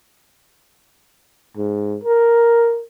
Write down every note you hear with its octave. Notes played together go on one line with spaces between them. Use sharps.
G#2
A#4